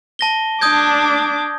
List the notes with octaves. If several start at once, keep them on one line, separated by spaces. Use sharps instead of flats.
A5 A#6 G7
D4 D6 D#6 G6 G#6